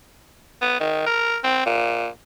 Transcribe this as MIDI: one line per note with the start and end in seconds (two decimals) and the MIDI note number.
0.62 0.78 59
0.80 1.02 51
1.06 1.37 70
1.44 1.62 60
1.66 2.08 46